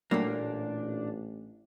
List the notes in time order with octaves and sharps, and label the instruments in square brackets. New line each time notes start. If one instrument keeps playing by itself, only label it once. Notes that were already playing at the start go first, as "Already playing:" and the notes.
[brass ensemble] A1 [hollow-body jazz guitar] A#2 A#3 [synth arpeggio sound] F#3 G3 A3 [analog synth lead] D4